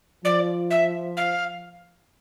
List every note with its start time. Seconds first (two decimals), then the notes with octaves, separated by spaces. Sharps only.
0.25 F3 D5
0.70 E5
1.17 F5